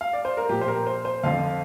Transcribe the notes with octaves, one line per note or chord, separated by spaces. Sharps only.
F5
D5
C5
A#4
A#2 F3 G4
C5
A#4
C5
C5
F2 D3 F3 F5